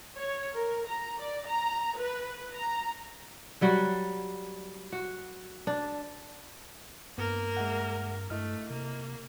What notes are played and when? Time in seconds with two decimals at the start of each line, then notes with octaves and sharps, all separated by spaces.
0.17 C#5
0.53 A#4
0.86 A#5
1.18 D5
1.47 A#5
1.97 B4
2.55 A#5
3.61 F#3 G3 F#4
4.92 F#4
5.67 D4
7.18 G2 A#3 B3 A#4
7.57 G#3 E5 F#5
8.30 G2 A3 E4 D#5 F6
8.70 C3 A#3